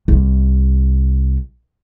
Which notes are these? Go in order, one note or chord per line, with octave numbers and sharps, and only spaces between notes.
C2 C3